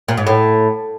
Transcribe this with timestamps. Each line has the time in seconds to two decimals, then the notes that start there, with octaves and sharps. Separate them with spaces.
0.08 A#2
0.18 G#2
0.27 A2